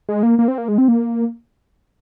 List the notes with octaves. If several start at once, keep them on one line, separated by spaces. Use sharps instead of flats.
G#3
A#3
A#3
C4
A#3
G#3
C4
A#3